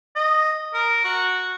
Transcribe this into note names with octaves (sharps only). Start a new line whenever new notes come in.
D#5
A#4
F#4